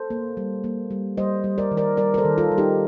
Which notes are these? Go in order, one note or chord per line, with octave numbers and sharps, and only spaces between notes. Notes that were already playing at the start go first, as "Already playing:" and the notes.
Already playing: A4 C5
A#3
G3
A#3
G3
G3 C5 D#5
G3
A#4 D5
D#3
A#4 D5
G3 A#4 D5
A#4
A4 C5
D#3
F4 A4
G3
D#4 G4